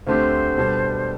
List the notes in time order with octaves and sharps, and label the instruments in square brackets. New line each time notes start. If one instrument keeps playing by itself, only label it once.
[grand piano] D2 D3 A3 C4 G4 [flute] C5
[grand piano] B2 G3 D4 A4